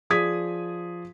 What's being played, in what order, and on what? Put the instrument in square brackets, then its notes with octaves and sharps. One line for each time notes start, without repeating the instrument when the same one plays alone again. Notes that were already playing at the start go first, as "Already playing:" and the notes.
[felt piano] F3 G#4 D5 D#6 G#6 B6